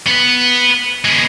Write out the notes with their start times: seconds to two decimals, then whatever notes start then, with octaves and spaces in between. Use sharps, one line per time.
0.07 B3 B4
1.05 G#3 B3